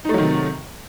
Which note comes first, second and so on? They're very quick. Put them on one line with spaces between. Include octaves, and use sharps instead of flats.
D#4 A3 F#3 D#3 C3